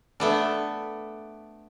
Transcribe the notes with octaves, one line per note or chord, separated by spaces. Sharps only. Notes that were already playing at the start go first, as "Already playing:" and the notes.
A3 B3 D4